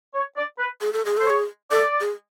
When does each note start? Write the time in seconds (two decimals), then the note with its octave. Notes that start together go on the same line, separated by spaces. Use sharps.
0.14 C#5
0.37 D5
0.59 B4
0.81 G#4
0.93 A4
1.05 G#4
1.17 A4 C5
1.26 G#4 C#5
1.71 A4 D5
2.01 G#4